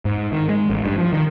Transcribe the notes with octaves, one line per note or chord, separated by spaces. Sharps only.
G#2
D#3
G#3
A1
G2
F3
D#3